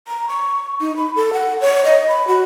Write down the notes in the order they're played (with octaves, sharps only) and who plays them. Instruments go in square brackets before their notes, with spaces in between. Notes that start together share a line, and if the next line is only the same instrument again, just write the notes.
[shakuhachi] A#5
C#6
D#4
B5
A4
F#5
C#5
D#5
B5
F#4